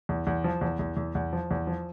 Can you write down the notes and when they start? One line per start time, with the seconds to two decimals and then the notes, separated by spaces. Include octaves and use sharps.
0.09 E2
0.27 E2
0.44 F3
0.61 E2
0.79 E2
0.97 E2
1.15 E2
1.33 F3
1.51 E2
1.67 F3